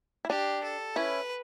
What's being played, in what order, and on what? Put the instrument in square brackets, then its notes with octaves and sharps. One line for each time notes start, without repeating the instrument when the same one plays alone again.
[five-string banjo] E4
[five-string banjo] D4 [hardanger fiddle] G4
[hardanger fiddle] A4
[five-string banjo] C#4 E4 [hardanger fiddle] B4